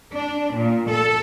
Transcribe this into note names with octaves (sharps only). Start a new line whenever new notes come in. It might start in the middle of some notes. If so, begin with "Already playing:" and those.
D4
A#2
A4